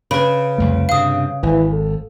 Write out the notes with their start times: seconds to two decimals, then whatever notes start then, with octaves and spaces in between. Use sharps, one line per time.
0.11 C#3 B4 B5
0.58 C2 F2 A3
0.89 G2 C3 F5 D#6
1.43 G#1 E3
1.72 A4